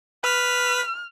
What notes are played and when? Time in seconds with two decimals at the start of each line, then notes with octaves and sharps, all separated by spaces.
0.24 B4 F6 B6